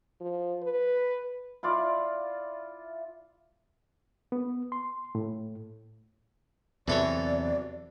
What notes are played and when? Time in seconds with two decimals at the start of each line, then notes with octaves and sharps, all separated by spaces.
0.21 F3
0.63 B4
1.63 E4 F4 D5 F5
4.32 B3
4.72 C6
5.15 A2
6.88 E2 C3 E3 F#3 A4 C#5 D5